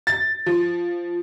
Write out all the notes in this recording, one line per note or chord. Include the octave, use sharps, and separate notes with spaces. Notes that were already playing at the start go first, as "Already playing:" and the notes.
A6
F3